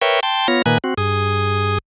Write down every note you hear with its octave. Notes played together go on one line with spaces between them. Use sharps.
A#4 B4 C#5 E5 G5 C#6
G5 A5 C6
B3 F4 C#5 A#6
A#2 D#3 A#3 B4 G#5 F#6
C4 F#4
G2 G#4 D#6